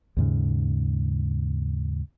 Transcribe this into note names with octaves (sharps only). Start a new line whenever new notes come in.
D#2 G#2 C#3